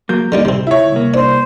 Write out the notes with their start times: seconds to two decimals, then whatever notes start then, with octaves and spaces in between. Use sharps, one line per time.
0.09 F#3 A#3 G6
0.32 D3 G3 A#3 D4 D#4
0.45 D2 C3 C4 C5
0.67 E4 C#5
0.92 C2 A#3
1.14 D4 C5